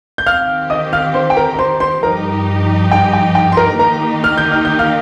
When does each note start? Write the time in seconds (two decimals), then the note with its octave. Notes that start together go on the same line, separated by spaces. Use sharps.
0.18 G6
0.26 D#3 C4 G4 F5 F6
0.70 D#5 D#6
0.93 F5 F6
1.14 C5 C6
1.30 G5
1.36 A#4 A#5
1.54 A#5
1.59 C5 C6
1.80 C5 C6
2.03 G2 F3 D#4 G4 A#4 A#5
2.91 G5
3.13 G5
3.35 G5
3.52 C6
3.57 A#4 A#5
3.79 D#3 A#3 D#4 G4 A#4 A#5
4.24 F6
4.38 G6
4.51 F6
4.65 G6
4.79 F5 F6